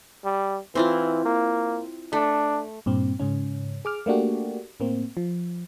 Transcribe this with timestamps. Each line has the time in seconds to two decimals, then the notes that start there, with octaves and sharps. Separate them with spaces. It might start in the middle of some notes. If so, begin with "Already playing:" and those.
0.24 G3
0.75 E3 C4 E4 F4
1.25 A#3
2.13 A3 D4
2.86 G2 A#2 C4
3.20 G#2 C#3 C#4
3.85 G#4 D6 F6
4.06 A3 A#3 D4 F#4 G4
4.80 A2 A#3 C4
5.17 F3